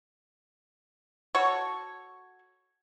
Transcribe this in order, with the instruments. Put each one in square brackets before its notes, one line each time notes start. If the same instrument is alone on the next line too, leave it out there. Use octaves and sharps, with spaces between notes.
[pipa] F#4 A4 C#5